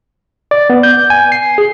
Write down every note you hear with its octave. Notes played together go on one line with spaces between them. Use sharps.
D5
B3
G6
G#5
C7
G#4